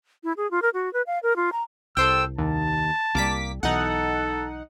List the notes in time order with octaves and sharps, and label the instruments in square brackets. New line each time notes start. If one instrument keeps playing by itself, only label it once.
[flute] E4
G#4
F4
A#4
F#4
B4
F5
A#4
F4
A#5
[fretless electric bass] C2 [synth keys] A4 C5 G5 [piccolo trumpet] E6
[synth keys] D#2 [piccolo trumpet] A5
[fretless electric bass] C2 G3 [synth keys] A#3 D6 B6
[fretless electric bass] B1 E3 [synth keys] D#4 F#5 [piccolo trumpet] A4